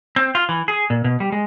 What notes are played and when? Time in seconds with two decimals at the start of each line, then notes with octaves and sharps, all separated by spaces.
0.16 C4
0.35 F4
0.49 E3
0.68 G#4
0.90 A#2
1.04 B2
1.20 G3
1.32 G#3